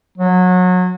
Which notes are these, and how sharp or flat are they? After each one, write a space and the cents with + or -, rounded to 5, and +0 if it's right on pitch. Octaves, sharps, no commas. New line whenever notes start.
F#3 -25